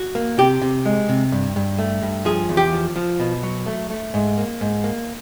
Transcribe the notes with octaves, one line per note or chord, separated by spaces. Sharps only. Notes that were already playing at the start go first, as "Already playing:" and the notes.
Already playing: F#4
A#3
C3 G4
C3
G#3
C3
G2
G2
A3
G2
F3 G#4
E2
G4
F3
F3
B2
F#3
A3
A3
G#2
A#3
G#2
A#3